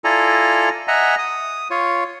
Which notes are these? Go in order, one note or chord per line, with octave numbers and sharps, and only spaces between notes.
E4 F4 A4 D5 G#5 A#5
D#5 E5 F#5 G#5 A#5
D#6
F4 C#5